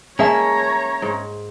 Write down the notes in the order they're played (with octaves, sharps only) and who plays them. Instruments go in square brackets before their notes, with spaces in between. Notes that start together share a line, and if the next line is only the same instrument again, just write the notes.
[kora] G#3 A#3 G#4 [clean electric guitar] C#4 E5 A5 [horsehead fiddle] C#5 A#5
[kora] G#2